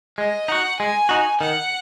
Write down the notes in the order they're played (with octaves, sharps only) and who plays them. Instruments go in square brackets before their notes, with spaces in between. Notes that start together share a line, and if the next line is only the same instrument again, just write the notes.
[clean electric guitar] G#3 [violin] D#5
[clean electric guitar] D#4 F#4 [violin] F#5
[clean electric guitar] G#3 [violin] G#5
[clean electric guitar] D#4 F#4
[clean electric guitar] D#3 [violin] F#5